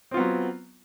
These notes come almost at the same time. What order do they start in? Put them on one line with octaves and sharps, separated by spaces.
C4 F4 B3 F#3